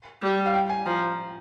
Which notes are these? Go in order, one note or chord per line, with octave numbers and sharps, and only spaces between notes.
G3
F5
G5
G#5
F3 A#5